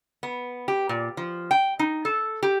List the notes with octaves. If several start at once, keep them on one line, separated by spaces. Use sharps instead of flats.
B3
G4
A#2
F3
G5
D#4
A4
G4